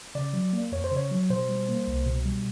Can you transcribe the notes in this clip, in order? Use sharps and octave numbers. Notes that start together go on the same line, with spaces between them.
C#3 D5
F#3
A#3
F2 C#5
C5
C#3
C#5
F#3
B2 C5
G3
A#3
C2
B2
G3